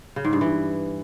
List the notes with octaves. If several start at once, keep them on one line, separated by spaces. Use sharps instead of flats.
C#3
G#2
G2
E3